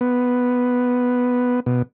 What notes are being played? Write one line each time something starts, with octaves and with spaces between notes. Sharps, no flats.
B3
B2